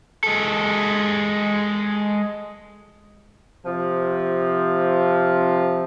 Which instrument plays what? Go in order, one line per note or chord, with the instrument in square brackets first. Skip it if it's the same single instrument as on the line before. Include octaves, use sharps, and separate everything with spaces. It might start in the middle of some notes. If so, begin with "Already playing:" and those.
[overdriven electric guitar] G#3 A4
[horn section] C3 F3